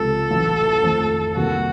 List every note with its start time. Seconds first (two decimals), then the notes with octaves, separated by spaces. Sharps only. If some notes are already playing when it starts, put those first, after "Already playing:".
Already playing: C#2 C3 F3 A4
0.30 A1 A2 F#3 A3
0.83 F2 D#3 A3
1.36 C2 C3 D#3 A#3 F#4